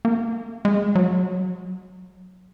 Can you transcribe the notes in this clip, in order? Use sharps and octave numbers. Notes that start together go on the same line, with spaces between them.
A#3
G#3
F#3